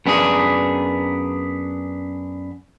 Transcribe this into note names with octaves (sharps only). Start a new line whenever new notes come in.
F#2 B3 D4 G#4